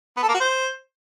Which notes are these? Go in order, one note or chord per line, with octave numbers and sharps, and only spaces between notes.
B3
A4
A#3
F#4
C5